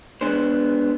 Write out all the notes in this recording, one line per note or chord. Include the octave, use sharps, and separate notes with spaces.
G#3 B3 D4 C5